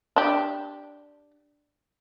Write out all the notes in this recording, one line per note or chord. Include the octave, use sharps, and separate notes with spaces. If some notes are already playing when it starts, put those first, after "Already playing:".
D4 G4